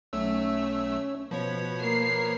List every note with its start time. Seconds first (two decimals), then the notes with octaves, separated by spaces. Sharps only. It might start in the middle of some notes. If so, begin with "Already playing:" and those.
0.13 B1 A3 C#4 E6
1.31 B2 F3 B4 C#5
1.81 A#3 C7